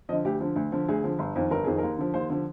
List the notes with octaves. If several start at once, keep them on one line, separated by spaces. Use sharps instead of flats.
D3 F3 D#5
D2 G4
D3 F3
D2
D3 F3
D2 G#4
D3 F3
G1
F2 D#3
G1 A#4
F2 D#3 G#4
D#2 A#4
D3 F3
D#2 C5
D3 F3